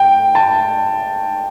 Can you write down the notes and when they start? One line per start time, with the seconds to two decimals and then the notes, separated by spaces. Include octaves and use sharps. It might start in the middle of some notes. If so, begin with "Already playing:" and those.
Already playing: G5
0.35 A5